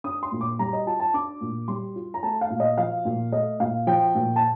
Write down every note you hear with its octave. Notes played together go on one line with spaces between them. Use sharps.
D4 D#6
C6
A#2
D6
G3 A#5
D#5
F4 A5
A5
D4 D6
A#2
G3 C6
F4
A#5
A3 A5
F5
A#2
D#5
F3 F5
A#2
A3 D#5
A#2 F5
F3 G5
A#2
A5